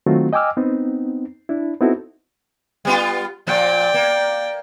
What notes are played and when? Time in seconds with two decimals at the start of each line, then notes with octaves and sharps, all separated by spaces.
0.06 D#3 F#3 A3 C4 F4 F#4
0.33 D#5 G5 G#5 D6 E6 F6
0.57 B3 C4 D#4
1.49 D4 E4
1.80 B3 C4 D#4 E4 F#4 A4
2.85 G3 B3 F4
3.47 A#2 F3 D5 G5
3.94 A#3